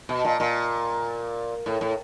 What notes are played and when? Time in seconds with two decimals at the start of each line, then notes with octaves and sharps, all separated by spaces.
0.09 B2
0.25 A#2
0.40 A#2
1.66 A2
1.81 A2